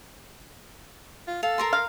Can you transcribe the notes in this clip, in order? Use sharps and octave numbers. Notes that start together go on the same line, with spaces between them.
F4
A4 F5
A#4 A#5 C6
F5